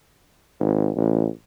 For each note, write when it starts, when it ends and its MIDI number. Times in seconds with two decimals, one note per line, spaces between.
0.60 0.90 32
0.97 1.27 33